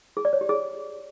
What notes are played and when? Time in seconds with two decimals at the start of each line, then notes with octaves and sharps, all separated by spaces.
0.17 G#4
0.25 D5
0.33 C#5
0.41 G4
0.49 G#4